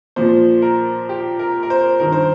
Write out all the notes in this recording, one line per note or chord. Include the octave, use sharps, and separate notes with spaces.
A#2 F3 C5
A#4
G4
A#4
A#4
C5
G2 D#3 A#4
C5